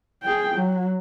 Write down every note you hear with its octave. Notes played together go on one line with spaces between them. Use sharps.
G#4 G5
F#3